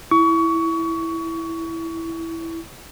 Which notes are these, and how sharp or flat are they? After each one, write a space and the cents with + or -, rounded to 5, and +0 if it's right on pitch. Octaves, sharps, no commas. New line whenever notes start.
E4 +0 C#6 +25